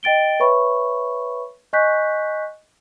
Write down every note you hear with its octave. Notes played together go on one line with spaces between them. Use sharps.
D#5 G5 A6 D7 G7
B4 C#5 E5 B5 C#6
D#5 G#5 C#6 F#6 G6 B6